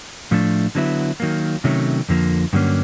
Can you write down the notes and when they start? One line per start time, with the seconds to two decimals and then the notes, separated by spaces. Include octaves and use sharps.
0.31 A2 F3 A3 D4
0.75 D3 F#3 B3 E4
1.20 D#3 F#3 A#3
1.64 C3 D#3 F#3 A3 C#4
2.09 F2 D3 F3 A#3
2.53 G2 D3 F#3 A#3 C#4